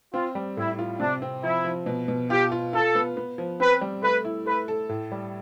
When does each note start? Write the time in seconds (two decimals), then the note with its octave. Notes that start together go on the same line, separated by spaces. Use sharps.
0.13 C4 F4
0.35 G3
0.57 A2 E4
0.79 F4
1.00 C3 D4
1.22 C4
1.44 F3 E4
1.64 F3
1.86 B2
2.08 B2
2.30 F4 G4
2.52 F4
2.73 F4 A4
2.95 B3
3.17 B3
3.38 F3
3.60 C4 B4
3.81 G3
4.03 A3 B4
4.25 E4
4.46 A3 B4
4.68 A4
4.89 A2
5.12 G3